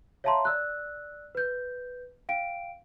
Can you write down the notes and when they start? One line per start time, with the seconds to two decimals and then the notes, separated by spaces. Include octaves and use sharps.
0.24 C#5 E5 F5 A5 A#5 C6
0.45 D5 E6 F#6
1.35 B4 G6
2.29 F5 G5 D7